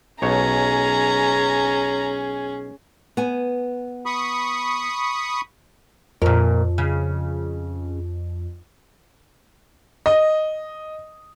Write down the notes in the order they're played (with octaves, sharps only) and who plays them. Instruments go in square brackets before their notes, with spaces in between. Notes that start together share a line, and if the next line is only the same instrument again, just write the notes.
[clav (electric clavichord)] B1 C#5 [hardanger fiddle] C#4 G#4 [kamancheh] A#5
[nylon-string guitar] B3 G#5
[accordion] B5 C#6 D#6
[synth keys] F2 [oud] A#2 A#4
[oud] C#3
[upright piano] D#5